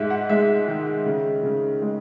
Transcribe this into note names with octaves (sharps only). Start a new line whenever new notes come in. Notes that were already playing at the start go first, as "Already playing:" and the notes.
Already playing: G#2 E5
F#5
G#3 E5
D#3
C#3
C#3
G#3 D#5